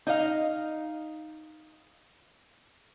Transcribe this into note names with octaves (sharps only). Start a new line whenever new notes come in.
D#4 D#5 F5